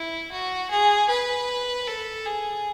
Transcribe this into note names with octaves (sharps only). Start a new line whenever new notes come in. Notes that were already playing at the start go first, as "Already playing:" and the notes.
Already playing: E4
F#4
G#4
B4
A4
G#4